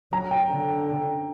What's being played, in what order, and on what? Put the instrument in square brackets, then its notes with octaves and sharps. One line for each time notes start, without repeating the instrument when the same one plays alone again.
[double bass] F#3 [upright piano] A#5
[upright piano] G5
[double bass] D3